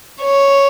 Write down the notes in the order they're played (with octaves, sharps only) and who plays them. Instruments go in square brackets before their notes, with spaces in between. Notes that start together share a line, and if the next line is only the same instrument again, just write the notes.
[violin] C#5